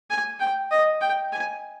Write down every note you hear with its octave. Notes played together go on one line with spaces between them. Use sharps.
G#5
G5
D#5
G5
G#5